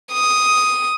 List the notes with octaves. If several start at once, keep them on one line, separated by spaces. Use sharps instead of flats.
D#6